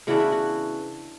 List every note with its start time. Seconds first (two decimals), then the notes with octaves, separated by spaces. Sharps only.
0.07 C#3 E3 B3 D4 F#4
0.20 E4
0.32 F#4